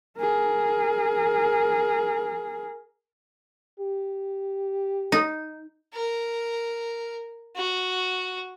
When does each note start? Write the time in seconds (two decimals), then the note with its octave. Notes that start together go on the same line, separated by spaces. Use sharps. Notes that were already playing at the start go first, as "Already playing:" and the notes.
0.17 G#4 A#4
3.80 G4
5.12 D#4
5.94 A#4
7.56 F#4